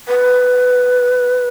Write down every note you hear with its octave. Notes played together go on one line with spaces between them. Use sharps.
B4